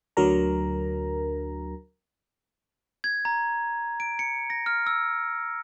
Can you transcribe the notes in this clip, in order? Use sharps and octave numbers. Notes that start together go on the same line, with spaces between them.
D2 D3 F#3 A#4 A#5
G#6
A#5
D7
C#7
A#6
F6
E6